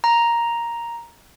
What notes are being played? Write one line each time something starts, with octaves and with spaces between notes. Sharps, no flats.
A#5